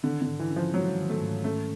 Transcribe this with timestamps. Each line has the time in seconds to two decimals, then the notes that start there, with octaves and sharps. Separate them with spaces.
0.03 D3 D#3
0.22 D3
0.27 G#2
0.39 E3
0.50 C#4
0.56 F3
0.74 F#3 G#3
0.97 D#3
1.09 A3
1.21 G#2
1.44 A3 C#4